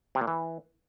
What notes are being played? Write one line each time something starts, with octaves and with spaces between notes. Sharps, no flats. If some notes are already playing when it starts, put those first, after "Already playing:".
C3
A#2
E3